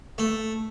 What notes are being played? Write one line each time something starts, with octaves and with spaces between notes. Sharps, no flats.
A3